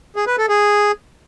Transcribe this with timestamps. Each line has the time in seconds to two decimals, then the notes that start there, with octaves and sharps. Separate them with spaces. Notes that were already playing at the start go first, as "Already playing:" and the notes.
0.16 G#4
0.27 B4
0.38 A4
0.49 G#4